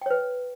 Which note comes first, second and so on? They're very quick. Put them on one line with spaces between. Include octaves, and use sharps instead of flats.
G5 C#5 B4